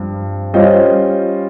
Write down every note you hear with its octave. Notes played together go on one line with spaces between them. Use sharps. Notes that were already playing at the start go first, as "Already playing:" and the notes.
Already playing: G2 F3 C4
G3 C#4 F4 C5 D#5